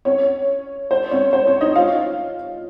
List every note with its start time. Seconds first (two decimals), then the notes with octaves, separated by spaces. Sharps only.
0.05 C#4 C#5
0.91 C5
1.11 C#4 C#5
1.33 C5
1.47 C#4 C#5
1.61 D#4 D#5
1.76 F4 F5